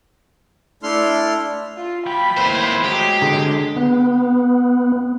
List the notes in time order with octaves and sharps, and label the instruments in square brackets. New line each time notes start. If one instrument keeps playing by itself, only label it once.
[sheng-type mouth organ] A3 D4 E4 A4 C6 F6
[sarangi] F4
[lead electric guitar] F#3 G5 [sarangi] B5
[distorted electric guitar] D#2 C5 [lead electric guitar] A2
[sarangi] F#3 [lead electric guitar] G#3 [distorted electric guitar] G4
[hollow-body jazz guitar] D3 G#4 A#5
[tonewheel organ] B3